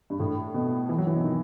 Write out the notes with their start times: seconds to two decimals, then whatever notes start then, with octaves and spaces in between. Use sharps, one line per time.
0.10 G2
0.20 A2
0.54 B2
0.89 E3
0.98 F#3
1.07 E3
1.15 B2
1.24 D#3